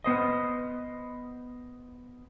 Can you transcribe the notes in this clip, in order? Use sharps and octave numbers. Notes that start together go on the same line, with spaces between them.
B3 C5 D#5